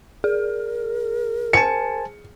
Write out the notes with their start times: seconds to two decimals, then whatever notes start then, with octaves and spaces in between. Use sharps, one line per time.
0.24 G#4 A#4
1.53 C5 G#5 A5 C#7